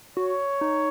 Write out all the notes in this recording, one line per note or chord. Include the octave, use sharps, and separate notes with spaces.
F#4 C#5
D#4